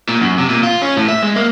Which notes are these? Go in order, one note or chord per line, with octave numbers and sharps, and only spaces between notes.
A#2
F#2
C3
A#2
F4
C#4
A2
E5
G#3
A#3